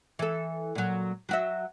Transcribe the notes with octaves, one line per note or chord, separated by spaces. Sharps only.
E3 A4
A#2 F#3
F#3 F#4 E5